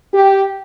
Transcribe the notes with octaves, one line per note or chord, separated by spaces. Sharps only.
G4